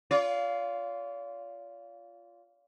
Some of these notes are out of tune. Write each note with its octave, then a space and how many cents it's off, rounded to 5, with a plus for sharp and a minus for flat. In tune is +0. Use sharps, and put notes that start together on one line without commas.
F4 +0 D5 -45